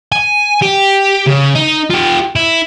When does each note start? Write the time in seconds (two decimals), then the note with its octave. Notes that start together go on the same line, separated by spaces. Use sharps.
0.12 G#5
0.62 G4
1.27 C#3
1.55 D#4
1.90 F4 G4
2.36 E4